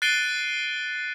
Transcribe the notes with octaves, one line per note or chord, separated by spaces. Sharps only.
F#6 A6 C7 D7 D#7 G7